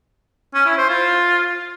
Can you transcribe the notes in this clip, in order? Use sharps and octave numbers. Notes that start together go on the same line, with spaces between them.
C#4
E4
C5
F4